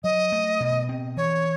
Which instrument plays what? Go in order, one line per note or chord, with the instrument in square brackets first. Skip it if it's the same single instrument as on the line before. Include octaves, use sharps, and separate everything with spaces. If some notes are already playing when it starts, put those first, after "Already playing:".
[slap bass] F#3 [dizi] D#5
[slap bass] A3
B2
C4
[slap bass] E3 [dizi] C#5